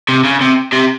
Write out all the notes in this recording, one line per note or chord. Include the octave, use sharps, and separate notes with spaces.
C3
C#3
C3
C3